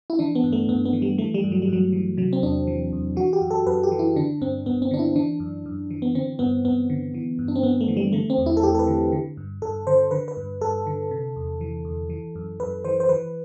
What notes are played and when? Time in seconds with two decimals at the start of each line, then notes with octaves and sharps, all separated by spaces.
0.10 E4
0.19 E3 D4
0.35 B3
0.44 G2
0.53 A3
0.68 G2 B3
0.85 B3
0.93 E3
1.02 G3
1.18 E3 A3
1.34 G3
1.44 G2
1.52 F#3
1.62 G3
1.68 G2 F#3
1.93 E3
2.17 C3 F#3
2.33 C4
2.43 E2 D4
2.67 E3
2.92 E2
3.16 E3 F#4
3.33 G4
3.41 F#2
3.51 A4
3.66 F#2 B4
3.83 G4
3.92 E3
3.99 E4
4.16 D3 D4
4.41 G2 C4
4.66 G2 B3
4.82 C4
4.91 D3 D4
4.99 E4
5.16 E3 D4
5.40 F#2
5.66 F#2
5.90 E3
6.02 B3
6.15 D3 C4
6.39 G2 B3
6.65 G2 B3
6.90 D3
7.14 E3
7.39 G2
7.48 D4
7.56 C4
7.63 G2 B3
7.81 A3
7.88 E3
7.97 G3
8.13 D3 A3
8.30 C4
8.38 E2
8.46 E4
8.57 A4
8.63 E2 G4
8.75 A4
8.79 B4
8.87 D3
9.12 D3
9.37 G2
9.62 G2 A4
9.87 D3 C5
10.11 D3 B4
10.28 B4
10.37 G2
10.61 G2 A4
10.87 D3
11.11 C3
11.36 E2
11.61 E3
11.85 E2
12.10 E3
12.35 F#2
12.60 F#2 B4
12.84 E3 C5
13.00 C5
13.09 E3 B4